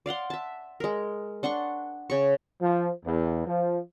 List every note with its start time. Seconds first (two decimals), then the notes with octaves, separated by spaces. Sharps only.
0.06 D5 F5 F#5 C6
0.30 E5 A5
0.80 G#3 A#4
1.43 D4 F#5 C6 C#6
2.10 C#3 C#6
2.62 F3
3.05 E2
3.47 F3